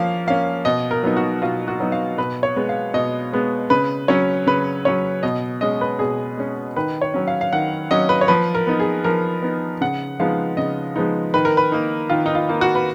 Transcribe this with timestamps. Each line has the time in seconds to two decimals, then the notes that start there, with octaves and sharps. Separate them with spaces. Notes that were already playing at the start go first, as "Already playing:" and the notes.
Already playing: F3 A#3 C#4 F5
0.27 A#3 C#4 F5
0.65 B2 D#5
0.91 A#4
1.03 F#3 B3 D#4
1.17 F#4
1.42 B2 F4
1.68 F#4
1.80 F#3 B3 D#4
1.92 F5
2.18 B2 B4
2.43 C#5
2.56 G#3 B3
2.69 F5
2.94 B2 D#5
3.33 G#3 B3
3.70 C#3 B4
4.08 F#3 C#4 C#5
4.47 C#3 B4
4.85 F#3 C#4 C#5
5.23 B2 D#5
5.61 G#3 C#4 D#5
5.81 B4
5.99 B2 G#4
6.38 G#3 C#4
6.76 D#3 B4
7.02 C#5
7.14 F#3 C#4
7.27 F5
7.41 F5
7.53 D#3 F#5
7.91 F#3 C#4 D#5
8.09 B4
8.21 C#5
8.28 F3 B4
8.55 A#4
8.67 B3 D#4
8.80 G#4
9.04 F3 A#4
9.42 B3 D#4
9.81 C#3 F#5
10.20 F3 G#3 B3 D#4 F5
10.57 C#3 D#5
10.96 F3 G#3 B3 D#4
11.34 D#3 B4
11.45 A#4
11.57 B4
11.72 A#3 D#4
12.10 D#3 F4
12.26 D#4
12.35 F4
12.49 A#3 D#4
12.61 F#4
12.75 B4